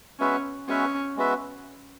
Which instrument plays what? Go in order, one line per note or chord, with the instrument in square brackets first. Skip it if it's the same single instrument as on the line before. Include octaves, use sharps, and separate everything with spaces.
[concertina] G#3 B3 F#4 B4 E5 [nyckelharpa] C#4
[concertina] G#3 B3 F#4 B4 E5 [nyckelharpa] C#4
[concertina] G#3 B3 F#4 B4 E5